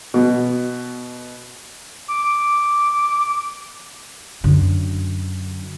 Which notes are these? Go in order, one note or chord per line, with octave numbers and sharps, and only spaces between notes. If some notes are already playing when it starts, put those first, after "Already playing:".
B2
D6
F#2 D3